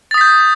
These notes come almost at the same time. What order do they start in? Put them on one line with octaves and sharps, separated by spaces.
A6 D#6 B6 G6